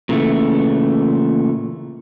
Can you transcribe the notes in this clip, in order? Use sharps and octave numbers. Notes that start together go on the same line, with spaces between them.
A#2 C#3 E3 A3